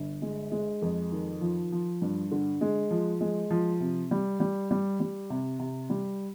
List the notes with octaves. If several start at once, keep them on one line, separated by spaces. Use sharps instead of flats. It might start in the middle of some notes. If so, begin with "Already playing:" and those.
Already playing: G1
G#3
G#3
F2
D#3
F3
F3
G2
D3
G#3
F3
G#3
F3
C3
G3
G3
G3
G3
C3
C3
G3